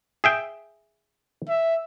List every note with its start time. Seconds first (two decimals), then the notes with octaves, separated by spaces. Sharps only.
0.24 G#4 E5 G5
1.49 E5